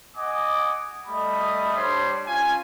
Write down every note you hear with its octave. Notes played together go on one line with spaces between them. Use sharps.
D#5 F#5 G#5 D6 D#6
G3 A3 D#5 B5 D#6
G3 D4 C5 C#5 C6
C#4 F4 G#5